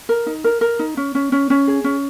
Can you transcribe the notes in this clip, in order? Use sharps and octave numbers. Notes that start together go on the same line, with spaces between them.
A#4
D#4
A#4
A#4
D#4
C#4
C#4
C#4
C#4
G#4
C#4